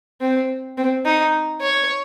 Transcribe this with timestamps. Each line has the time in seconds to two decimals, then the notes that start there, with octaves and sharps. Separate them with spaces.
0.21 C4
0.77 C4
1.05 D#4
1.62 C#5